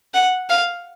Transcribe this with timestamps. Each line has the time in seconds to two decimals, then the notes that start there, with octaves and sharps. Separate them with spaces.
0.14 F#5
0.49 F5